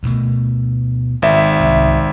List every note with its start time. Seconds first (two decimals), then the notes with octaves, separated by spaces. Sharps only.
0.03 D2 B2 A3
1.22 G#1 E5
1.60 C2 G#2